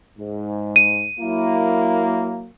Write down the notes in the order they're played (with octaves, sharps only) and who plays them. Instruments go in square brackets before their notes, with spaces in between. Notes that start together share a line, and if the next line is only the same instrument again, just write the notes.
[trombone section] G#2
[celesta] D#7
[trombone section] F#3 A#3 [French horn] E4